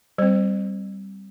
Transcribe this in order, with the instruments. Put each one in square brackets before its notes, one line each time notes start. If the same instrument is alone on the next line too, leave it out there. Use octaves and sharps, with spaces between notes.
[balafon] G3 C4 C5